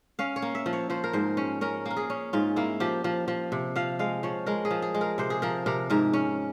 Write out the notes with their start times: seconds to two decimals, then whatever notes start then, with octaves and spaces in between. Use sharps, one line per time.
0.19 C#4 F5
0.36 C#5
0.42 A#3
0.55 E5
0.66 F3
0.73 C#5
0.90 F3 C5
1.04 A#4
1.13 G#2 C5
1.37 C#4
1.61 C#4 A#4
1.86 A#3 A#4
1.97 G#4
2.10 C#4
2.33 G#2 F4
2.56 A#3 E4
2.80 F3 G4
3.04 F3
3.28 F3
3.52 C3
3.76 F3 F5
3.99 G#3 F5
4.23 F3 C#5
4.46 G#3 A#4
4.65 G#4
4.71 F3
4.82 G#4
4.94 G#3
5.01 A#4
5.18 C3 C5
5.30 G#4
5.42 F3 A#4
5.66 C3 A#4
5.90 G#2 A#4
6.13 C#4